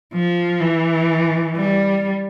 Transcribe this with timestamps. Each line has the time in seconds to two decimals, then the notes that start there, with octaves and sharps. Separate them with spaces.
0.14 F3
0.61 E3
1.56 G3